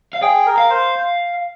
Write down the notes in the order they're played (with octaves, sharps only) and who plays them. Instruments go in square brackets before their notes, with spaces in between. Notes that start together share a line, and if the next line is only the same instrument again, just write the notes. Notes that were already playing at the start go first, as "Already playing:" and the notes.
[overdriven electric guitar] F5
[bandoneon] G#4 [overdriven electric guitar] G5
[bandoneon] A#4
[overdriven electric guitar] F5
[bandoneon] C5